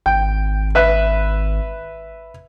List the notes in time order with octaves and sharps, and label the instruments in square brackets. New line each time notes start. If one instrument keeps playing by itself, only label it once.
[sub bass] G#1 [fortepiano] G5
[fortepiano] B4 E5 F#6